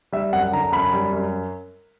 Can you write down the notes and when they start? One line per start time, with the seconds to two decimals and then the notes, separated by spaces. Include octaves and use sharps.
0.12 G3 E5
0.33 F#2 F#5
0.52 D3 A#5
0.72 F#2 B5
0.93 G3
1.12 F#2